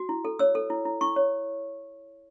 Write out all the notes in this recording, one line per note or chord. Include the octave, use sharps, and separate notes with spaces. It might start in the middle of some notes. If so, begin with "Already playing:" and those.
Already playing: F#4
E4
A4
C#5 E6
A4
E4
E4
E4 C#6
C#5